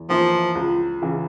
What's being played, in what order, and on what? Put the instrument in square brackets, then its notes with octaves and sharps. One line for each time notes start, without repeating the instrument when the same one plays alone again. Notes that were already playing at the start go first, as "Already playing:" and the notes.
Already playing: [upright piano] E2
[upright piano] E3 A#3 E4 [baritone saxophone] F3
[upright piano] C#2
C#3 E3